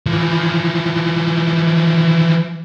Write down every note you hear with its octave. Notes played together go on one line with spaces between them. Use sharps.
E3 F3